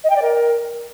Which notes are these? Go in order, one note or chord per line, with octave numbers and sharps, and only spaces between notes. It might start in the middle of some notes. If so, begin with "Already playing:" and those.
D#5
G5
D5
A#4